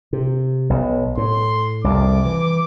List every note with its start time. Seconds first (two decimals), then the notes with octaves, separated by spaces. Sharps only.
0.13 C3
0.70 B1
1.17 A2 C6
1.84 C2 F2 D6
2.25 E3